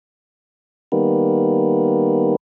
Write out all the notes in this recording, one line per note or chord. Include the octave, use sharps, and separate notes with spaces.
D#3 G3 A#3 B3